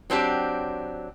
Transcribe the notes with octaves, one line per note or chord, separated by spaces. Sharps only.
F#3 C4 D4 G4